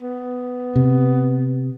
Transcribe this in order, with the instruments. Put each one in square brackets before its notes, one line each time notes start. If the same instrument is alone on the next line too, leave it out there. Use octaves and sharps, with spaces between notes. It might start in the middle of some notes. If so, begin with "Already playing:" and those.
[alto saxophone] B3
[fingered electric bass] C3